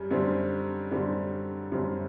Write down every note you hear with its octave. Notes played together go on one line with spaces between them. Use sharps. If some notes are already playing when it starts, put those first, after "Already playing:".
Already playing: F#2 G3
F#2 D3 G3 C4
F#2 D3 G3 C4
F#2 D3 G3 C4